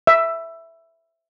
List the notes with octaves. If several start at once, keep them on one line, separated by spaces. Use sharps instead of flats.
E5